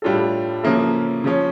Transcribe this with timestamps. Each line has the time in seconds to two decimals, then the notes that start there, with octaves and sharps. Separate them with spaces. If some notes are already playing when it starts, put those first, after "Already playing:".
0.02 A2 G3 D4 F4 A4
0.63 C#3 F3 A#3 E4 A4
1.24 C#3 F3 C#4